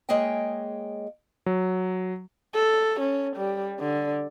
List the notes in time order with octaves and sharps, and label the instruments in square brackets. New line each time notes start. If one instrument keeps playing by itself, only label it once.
[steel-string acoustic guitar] G#3 A#3 G#4 C#5 D#5 G5
[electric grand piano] F#3
[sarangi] A4
C#4
G3
D3